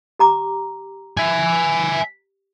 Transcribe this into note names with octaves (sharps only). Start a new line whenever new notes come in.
G4 A#5 D6
E5 G#5